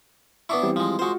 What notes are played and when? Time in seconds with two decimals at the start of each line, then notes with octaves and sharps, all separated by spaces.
0.49 B3 D4 E4 C#6
0.62 E3 G3 C4
0.76 F3 G#3
0.99 G#3 F4 F#4 C5 C#6